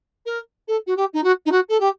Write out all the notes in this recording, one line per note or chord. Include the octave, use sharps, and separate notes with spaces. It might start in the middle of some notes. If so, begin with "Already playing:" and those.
A#4
A4
F#4
G4
D#4
F#4
D#4
F#4
A4
G4